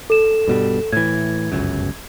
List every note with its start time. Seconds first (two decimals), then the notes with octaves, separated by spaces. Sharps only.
0.10 A4 E7
0.48 G2 B2 G3
0.92 A2 E3 G#6
1.52 G1 C#2 F#2